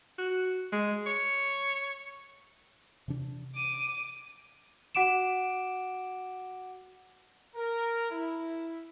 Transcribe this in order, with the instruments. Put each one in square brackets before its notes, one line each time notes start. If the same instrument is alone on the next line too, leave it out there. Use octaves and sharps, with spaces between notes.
[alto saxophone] F#4
G#3
C#5
[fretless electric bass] C3 E3 D4
[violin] D6 D#7
[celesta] F#4 F#5 D6 D7 E7
[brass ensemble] A#4
E4